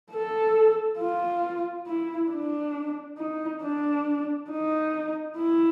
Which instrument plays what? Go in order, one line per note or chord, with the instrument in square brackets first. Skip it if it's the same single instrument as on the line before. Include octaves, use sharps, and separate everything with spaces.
[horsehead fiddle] A4
F4
E4
D4
D#4
D4
D#4
E4